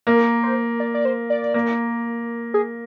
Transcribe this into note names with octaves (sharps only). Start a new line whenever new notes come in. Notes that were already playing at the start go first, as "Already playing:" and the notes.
A#3 A#4
C5
D5
D5
C5
D5
A#3
G#4